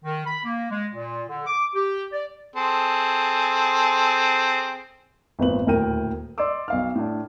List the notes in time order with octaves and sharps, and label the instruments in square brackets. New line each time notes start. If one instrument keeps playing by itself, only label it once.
[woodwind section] D#3
B5
A#3
G#3
A#2
D3
D6
G4
D5
[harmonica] C4 G#4 A4
[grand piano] G#1 E2 A#2 B4 F#7
D#1 D2 A2 A#4 G5 D#7
D5 D#5 C6 D6 E6
B1 F5 F6
A2 D4